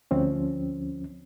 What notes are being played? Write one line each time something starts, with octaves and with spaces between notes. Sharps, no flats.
D2 F3 C4 C#4